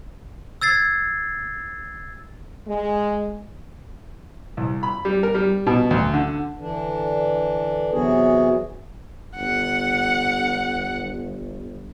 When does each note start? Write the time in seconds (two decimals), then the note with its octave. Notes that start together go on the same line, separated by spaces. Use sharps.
0.61 E6 G#6 A6 C7
2.67 G#3
4.57 C2
4.83 B5
5.05 G3
5.23 A#4
5.35 G3
5.67 B2
5.91 D2
6.14 D3
6.58 D3 E3 D4
7.91 C3 E3 F#3 B3 F#4 G#4
9.37 G1 F#5